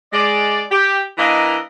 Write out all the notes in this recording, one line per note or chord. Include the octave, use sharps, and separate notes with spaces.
G#3 D5
G4
E3 A#3 D4 A#4 D#5